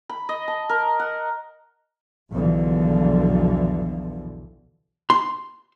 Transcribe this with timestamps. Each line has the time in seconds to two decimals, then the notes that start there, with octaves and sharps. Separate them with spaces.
0.09 B5
0.29 D#5
0.48 A5
0.69 A#4
0.99 F#5
2.30 B1 E2 B2 D3 E3 F3
5.10 C6